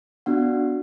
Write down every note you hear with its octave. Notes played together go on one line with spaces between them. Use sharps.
B3 D4 F#4 F#5